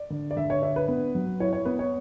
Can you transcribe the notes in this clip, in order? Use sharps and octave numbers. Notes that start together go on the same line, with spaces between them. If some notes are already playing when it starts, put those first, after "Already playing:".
Already playing: D5
D3
D5
D3 E5
C#5
D4 E5
B4
B3
F#3
E4 C#5
C#5
B3 B4
C#5